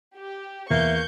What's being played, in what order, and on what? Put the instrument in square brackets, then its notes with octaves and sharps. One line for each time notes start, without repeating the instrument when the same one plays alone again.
[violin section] G4
[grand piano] E2 [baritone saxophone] A#3 [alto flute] E5 [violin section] C#6 G6